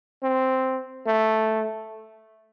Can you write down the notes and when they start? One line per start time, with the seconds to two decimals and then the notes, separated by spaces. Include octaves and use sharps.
0.23 C4
1.07 A3